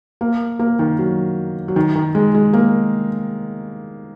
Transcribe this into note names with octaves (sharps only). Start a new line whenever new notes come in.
A#3
A#3
D#3
F#3
F#3
D#3
D#3
G#3
G#3
A#3